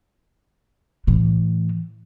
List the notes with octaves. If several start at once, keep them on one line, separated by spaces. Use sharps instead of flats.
A2 E3